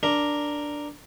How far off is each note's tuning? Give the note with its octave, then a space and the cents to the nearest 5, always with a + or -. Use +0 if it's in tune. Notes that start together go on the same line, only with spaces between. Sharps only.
D4 +0 A#4 +0